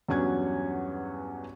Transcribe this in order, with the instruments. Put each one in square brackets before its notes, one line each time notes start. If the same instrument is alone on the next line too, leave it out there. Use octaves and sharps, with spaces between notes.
[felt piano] E2 G2 F#3 C#4 F#5 G#6